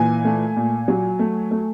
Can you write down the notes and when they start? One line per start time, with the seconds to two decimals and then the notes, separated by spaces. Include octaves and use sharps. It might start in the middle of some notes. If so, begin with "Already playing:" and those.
Already playing: A#2 E3 G#5
0.25 A3
0.56 A#2
0.88 F#3
1.19 A3
1.51 A3